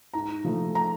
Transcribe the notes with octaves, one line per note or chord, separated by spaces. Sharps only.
G#2 A#5
F3 A3
A#5